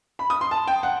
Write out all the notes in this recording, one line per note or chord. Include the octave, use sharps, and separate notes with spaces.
B5
D#6
C6
A5
G5
F#5